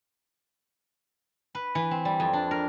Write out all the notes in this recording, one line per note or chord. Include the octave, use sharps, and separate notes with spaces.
B4
E3
C4
G3
F2
D4
A#4